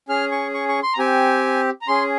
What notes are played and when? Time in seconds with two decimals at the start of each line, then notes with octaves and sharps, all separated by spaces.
0.09 C#4 G#4 F6
0.32 C#6
0.54 C#6
0.69 C#6
0.83 C6
0.94 A#5
0.98 C4 G4 G#5
1.81 A#5
1.88 C#4 G#4 C6